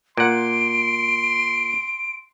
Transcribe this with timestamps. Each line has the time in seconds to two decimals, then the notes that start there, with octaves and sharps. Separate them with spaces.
0.17 A#2 F#5 C6 D7